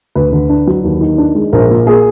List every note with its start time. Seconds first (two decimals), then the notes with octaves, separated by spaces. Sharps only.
0.15 D2 B4
0.32 D3
0.49 D4
0.67 F#3
0.84 D#2
1.01 D#3
1.18 D4
1.35 G#3
1.53 A#1 A#4
1.71 A#2
1.87 A#3 G#4